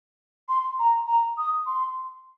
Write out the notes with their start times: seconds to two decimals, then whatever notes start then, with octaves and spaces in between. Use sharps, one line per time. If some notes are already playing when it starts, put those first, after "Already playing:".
0.49 C6
0.79 A#5
1.07 A#5
1.38 D#6
1.66 C6